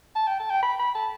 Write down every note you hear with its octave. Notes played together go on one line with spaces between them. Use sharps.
A5
G5
A5
G5
B5
B5
A5